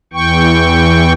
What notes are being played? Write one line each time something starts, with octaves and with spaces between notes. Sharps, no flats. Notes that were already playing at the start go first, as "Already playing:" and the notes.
E2 E3 G5 C#6